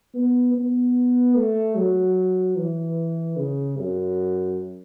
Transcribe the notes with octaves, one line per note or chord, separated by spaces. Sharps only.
B3
B3
A3
F#3
E3
C#3
F#2